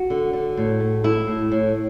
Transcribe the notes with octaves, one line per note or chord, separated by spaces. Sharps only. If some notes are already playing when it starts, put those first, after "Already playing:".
Already playing: F#4
D3
D3
A2
A3
A3 E4
A2
A2